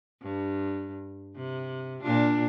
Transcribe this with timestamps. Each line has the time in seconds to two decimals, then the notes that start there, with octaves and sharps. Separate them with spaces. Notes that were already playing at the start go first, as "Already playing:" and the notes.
0.22 G2
1.36 C3
2.01 A#2 D4 F4